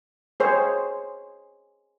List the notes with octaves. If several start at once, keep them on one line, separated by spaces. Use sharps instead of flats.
G#4 C5 C#5